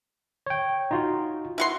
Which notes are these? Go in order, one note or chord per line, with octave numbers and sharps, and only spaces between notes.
C#5 G5
D#4 F4 F#4
E4 F#4 C6